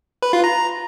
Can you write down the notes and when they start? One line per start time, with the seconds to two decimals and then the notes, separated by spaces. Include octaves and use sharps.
0.22 B4
0.33 F4
0.44 A#5